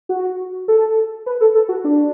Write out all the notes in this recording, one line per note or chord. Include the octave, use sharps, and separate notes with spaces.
F#4
A4
B4
A4
A4
F#4
D4